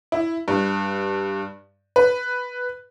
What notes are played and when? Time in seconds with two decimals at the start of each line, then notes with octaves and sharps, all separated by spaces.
0.12 E4
0.48 G2
1.96 B4